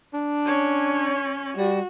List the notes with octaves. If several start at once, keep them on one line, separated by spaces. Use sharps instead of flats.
D4
C#4 C#5
G3 F#4